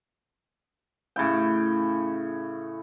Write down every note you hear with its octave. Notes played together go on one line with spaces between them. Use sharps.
A2 C#3 E4 G5